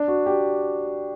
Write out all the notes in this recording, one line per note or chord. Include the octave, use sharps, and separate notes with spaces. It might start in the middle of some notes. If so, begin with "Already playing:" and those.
Already playing: D4
F#4
G4